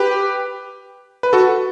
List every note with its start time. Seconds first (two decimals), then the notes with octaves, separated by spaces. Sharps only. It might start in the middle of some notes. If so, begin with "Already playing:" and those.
Already playing: G4 B4
1.23 B4
1.33 F#4 A4